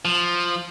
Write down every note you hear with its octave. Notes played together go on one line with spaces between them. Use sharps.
F3